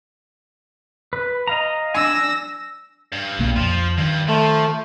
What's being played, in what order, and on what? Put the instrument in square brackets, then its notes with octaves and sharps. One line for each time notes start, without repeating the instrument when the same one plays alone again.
[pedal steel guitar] B4
D#5 F5 A#5
[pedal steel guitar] D4 G#5 [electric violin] E6 A#6
[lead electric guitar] G2
[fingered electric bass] B1 A#2 A#3
[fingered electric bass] F2 [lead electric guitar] F3
[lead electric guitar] G2 [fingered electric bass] D#3
[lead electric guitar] F3 [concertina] A3